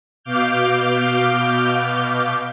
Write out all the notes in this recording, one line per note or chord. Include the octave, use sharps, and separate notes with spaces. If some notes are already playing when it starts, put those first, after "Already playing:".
B2 F5 D6 F6 G6